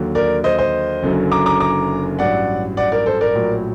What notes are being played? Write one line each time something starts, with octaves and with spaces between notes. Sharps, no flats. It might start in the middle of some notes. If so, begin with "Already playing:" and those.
Already playing: D#2 D3 F#3
A#4 D5
C5 D#5
C5 D#5
F#1 F#2 D3 F#3
A#5 D6
A#5 D6
A#5 D6
A1 G2 F#3 D5 F#5
D5 F#5
A#4 D5
A4 C5
A#4 D5
A#1 A2 F#3